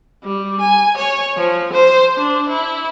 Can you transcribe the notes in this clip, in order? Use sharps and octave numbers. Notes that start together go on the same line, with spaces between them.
G3
G#5
C#5
F3
C5
D4
E4